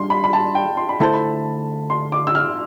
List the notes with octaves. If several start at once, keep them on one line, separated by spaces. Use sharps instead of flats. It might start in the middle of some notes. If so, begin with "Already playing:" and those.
Already playing: G3 D4 C6
B5
B5
A5
G5
C6
B5
D3 A3 E4 A4 C5 A5
B5
C6
D6
E6
F6